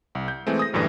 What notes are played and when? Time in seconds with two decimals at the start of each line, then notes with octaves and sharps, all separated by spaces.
0.15 C2
0.28 G6
0.47 E3 G#3 A3 C4
0.59 D#6 A#6
0.73 A1 F#2 A2 D3 E3 G3